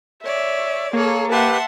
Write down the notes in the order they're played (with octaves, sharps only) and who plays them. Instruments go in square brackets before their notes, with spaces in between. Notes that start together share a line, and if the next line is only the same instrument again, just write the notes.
[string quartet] C#5 D5 [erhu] E5
[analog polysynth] A#3 [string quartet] G#4 A4 [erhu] C#5
[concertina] G4 B4 [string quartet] E5 F#5 C6 [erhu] A5